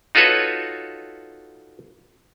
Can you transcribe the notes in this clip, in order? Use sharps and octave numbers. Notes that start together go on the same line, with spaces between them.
D#4 F4 F#4 A4 B4 C#5